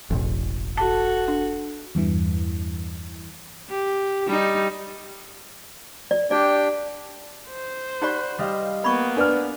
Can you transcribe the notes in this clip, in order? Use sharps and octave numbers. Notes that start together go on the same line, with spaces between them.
E1 A1
F#4 A4 A5
D4
E2 G2 E3
G4
G3 D#4
D5
D4 G4 D5 G5
C5
D#4 G4 D5 F#5 B5 C#6
G3 D#5 F5
A#3 B3 B5 C#6 G#6
D4 B4 D5 F6